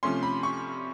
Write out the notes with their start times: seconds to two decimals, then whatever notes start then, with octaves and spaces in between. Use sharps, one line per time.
0.03 C3 F3 A3 C#4 C6
0.23 B5
0.43 C#6